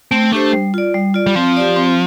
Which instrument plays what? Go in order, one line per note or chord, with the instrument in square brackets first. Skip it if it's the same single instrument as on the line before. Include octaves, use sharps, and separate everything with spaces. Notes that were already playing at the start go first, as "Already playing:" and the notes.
[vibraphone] A3 [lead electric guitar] C4
[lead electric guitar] A3 [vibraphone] D4 G4 C5
[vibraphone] G3
F4 D5
G3
F4 D5
[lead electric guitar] G3
[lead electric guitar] F3 [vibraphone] C4
[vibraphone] G4 D5
C4